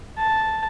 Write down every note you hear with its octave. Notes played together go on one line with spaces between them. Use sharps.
A5